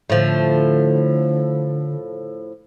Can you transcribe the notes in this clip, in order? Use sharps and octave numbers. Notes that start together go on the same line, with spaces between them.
A2 D3 F3